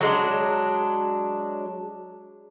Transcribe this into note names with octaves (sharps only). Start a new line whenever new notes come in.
F#3 G#3 D4